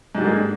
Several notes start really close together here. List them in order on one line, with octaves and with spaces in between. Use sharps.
G#2 G3 D3 A#3 G#3